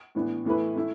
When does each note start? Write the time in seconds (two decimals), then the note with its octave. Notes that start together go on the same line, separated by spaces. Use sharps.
0.15 A2 E3 B3 D4
0.45 A2 E3 A3 E4 B4
0.75 A3 E4